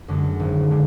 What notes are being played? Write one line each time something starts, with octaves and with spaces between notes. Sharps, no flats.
F#2 D3 G#3
G#1
D3 G#3